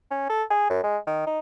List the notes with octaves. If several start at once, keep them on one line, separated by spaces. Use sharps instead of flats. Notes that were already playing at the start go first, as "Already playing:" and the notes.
C#4
A4
G#4
F#2
G#3
D#3
D#4